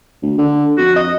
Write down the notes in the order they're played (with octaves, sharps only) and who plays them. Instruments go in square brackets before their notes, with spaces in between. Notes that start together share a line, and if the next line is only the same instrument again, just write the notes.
[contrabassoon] D2
D3
[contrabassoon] F2 [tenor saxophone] F#4
[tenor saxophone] D#5